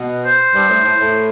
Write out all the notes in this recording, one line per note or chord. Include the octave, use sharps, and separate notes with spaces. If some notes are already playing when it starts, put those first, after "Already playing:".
Already playing: B2
C5
G2
A2
A2
A2